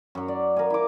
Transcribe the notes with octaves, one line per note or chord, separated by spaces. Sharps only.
F#2 F#3
D5
A#4 F5 G#5
E4 D6